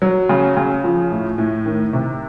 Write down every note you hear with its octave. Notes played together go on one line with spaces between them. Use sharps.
F#3
C#3
C#3
F3
A2
A2
D#3
C3